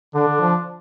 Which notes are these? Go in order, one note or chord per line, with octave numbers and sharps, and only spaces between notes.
D3 D4
D3
F3